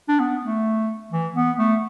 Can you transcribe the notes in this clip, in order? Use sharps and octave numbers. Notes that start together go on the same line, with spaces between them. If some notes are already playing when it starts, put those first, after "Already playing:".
D4
B3
A3
E3
B3
A3